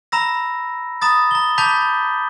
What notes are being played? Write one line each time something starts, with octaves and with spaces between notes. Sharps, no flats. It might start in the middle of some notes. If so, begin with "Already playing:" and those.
A#5 B5 E6 A#6
A#5 B5 D#6 A6
A#5 G7
A5 B5 D6 G6 B6